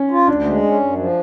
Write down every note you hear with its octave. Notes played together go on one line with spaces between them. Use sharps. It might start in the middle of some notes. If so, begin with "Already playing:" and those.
Already playing: C#4
F4
D2 D4
G#3
C#4
F#2
F3